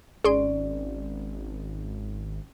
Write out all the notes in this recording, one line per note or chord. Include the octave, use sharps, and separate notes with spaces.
G#1 C#4 G#4 D5 C6